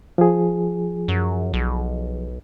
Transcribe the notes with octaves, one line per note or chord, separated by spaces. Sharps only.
F3 G#4
F#2
B1